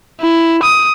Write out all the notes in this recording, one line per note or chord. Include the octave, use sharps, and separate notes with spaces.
E4
D#6